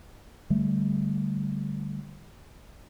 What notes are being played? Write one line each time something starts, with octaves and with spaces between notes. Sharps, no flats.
D3 G3 A3